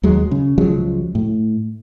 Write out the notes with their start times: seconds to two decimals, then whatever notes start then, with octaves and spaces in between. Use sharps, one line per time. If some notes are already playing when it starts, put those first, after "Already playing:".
0.03 D#2 F#3 G#3
0.31 C#3
0.58 C#2 F3 F#3 G#3
1.15 A2